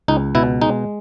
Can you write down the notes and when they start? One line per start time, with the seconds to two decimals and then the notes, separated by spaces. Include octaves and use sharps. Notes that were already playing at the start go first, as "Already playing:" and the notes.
0.08 C#2 D#4
0.35 B2 E4
0.61 G#3 D#4